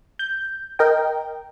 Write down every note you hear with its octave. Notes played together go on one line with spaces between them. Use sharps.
G6
A#4 D#5 G5